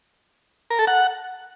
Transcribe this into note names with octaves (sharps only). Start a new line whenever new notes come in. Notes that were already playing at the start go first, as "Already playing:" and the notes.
A#4
A4
F#5